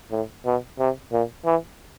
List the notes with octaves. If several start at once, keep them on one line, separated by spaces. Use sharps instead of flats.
A2
B2
C3
A#2
E3